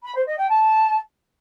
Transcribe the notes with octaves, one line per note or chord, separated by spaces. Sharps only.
B5
C5
D#5
G5
A5